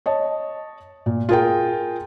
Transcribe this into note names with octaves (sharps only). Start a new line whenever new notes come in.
C#5 D#5 A5
A#2
F4 G#4 A#4 G5